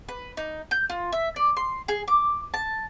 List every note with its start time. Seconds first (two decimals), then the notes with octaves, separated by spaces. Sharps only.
0.08 B4
0.37 D#4
0.71 G6
0.90 F4
1.12 E5
1.36 D5
1.57 C6
1.88 G#4
2.08 D6
2.54 A5